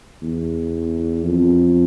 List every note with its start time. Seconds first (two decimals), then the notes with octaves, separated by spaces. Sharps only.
0.22 E2
1.24 F2